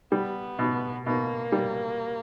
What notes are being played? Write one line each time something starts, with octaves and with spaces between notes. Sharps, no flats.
G3 B3
B2
B2 A#3
G3